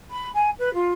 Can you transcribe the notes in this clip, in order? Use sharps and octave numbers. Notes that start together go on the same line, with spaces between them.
B5
G#5
B4
F4